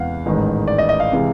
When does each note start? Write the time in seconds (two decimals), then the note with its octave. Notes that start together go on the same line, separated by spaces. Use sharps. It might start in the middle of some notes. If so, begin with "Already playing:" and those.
Already playing: E2 C3 E3 G#3 F5 F#5
0.26 A1 G#2 D#3 G#3
0.68 D5
0.78 D#5
0.89 D#5
1.00 F5
1.12 C3 E3 G#3